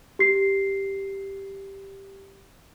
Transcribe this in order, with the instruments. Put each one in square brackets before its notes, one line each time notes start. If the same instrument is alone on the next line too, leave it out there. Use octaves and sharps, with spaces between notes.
[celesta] G4 C7